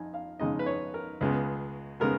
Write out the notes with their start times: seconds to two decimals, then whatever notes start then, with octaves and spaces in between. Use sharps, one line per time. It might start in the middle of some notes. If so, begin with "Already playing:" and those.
Already playing: F2 D#4 G#5
0.14 F5
0.39 F2 C#3 G#3 D#4 D#5
0.59 B4
0.66 C#5
0.94 A#4
1.21 C#2 C#3 G#3 B3
2.00 C#3 G#3 B3 A#4